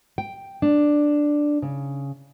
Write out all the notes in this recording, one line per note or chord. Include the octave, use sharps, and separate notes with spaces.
G5
D4
C#3